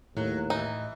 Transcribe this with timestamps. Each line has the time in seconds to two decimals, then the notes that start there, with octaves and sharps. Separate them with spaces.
0.17 D#2 A2 F#3
0.50 E3 D#4